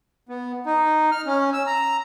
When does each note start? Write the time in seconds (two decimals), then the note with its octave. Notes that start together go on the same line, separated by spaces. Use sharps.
0.29 B3
0.66 D#4
1.12 F6
1.27 C#4
1.53 E6
1.67 A#5